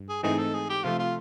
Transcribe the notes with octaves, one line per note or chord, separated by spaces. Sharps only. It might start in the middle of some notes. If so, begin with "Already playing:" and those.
Already playing: G2
G#4
G#2 E3 A3 C4 D#4 G#4
A4
G#4
G4
C3 F3 A3 F4
F4